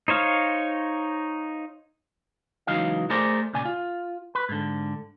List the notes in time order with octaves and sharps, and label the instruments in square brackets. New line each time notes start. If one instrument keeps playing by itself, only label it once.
[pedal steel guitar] D#4 C5 C#5 F5
[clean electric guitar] C#2 E3 F#3 D#4 F5
A3 G#4 A#4 C5 D5
A#2 C#3 D5 G#5
F4
B4
G#2 D3